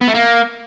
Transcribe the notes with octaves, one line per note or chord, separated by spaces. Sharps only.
B3
A3
A#3